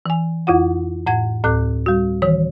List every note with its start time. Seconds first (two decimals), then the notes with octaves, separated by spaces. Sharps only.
0.06 E3 G#5
0.47 F2 E4 F4 F#5
1.07 A2 F#5 G#6
1.44 D2 A2 A4 D6 F#6
1.86 G3 F#4
2.22 D#3 E3 C#5